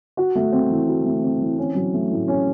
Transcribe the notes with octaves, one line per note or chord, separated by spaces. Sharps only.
F#4
A3
C4
E3
F#4
A3
C4
E3
C#4
F#3
A3
A2
C#4